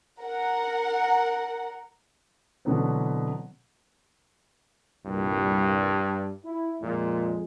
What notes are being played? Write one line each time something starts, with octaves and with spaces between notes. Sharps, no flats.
A#4 F#5
B2 D3 E3 F#3 B3 C4
C2 G2 A#2
E4
F2 A#2 G#3